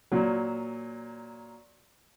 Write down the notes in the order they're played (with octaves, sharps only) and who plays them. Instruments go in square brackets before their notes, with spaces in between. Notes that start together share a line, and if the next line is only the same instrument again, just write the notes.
[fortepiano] A#2 F#3